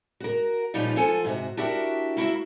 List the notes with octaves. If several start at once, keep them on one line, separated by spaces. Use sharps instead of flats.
F#4 A#4
A#2 F3 G3 C#4 D#4 F4
F3 F4 A4 F#5 G#5
G#2 C3 F#4
D4 E4 F#4 G4 A#4 E5
A#3 E4 F#4 E5